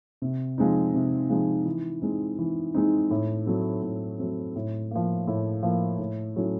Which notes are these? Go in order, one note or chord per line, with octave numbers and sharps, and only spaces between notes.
C3
F3 G#3 C4 D#4
C3
F3 G#3 C4 D#4
E3
G#3 C4 D#4
E3
G#3 C4 D#4
A2
F#3 A3 C4
A2
F#3 A3 C4
A2
F3 A#3
A2
F3 A#3
A2
F#3 A3 C#4 E4